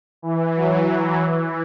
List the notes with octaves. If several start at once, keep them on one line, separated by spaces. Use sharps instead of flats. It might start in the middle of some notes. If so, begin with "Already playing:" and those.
E3
F#3
E3